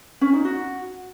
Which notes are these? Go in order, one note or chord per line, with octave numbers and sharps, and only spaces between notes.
C#4
D#4
F#4